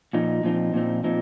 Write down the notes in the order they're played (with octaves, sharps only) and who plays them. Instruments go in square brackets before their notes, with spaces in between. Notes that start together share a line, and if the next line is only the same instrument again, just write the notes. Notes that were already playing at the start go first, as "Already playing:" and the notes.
[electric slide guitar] A#2 F3 D#4
A#2 F3 C4 D#4
A#2 F3 C4 D#4
A#2 F3 C4 D#4